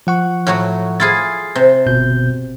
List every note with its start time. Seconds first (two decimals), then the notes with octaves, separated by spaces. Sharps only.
0.07 F3 F#5 C#6
0.47 A2 F#3 F#4
1.00 E4 F4 G#4 A6 C7
1.55 C3
1.86 G1 B2 G6